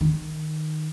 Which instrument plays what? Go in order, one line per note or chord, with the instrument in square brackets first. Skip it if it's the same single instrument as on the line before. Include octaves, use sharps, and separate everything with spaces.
[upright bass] D#3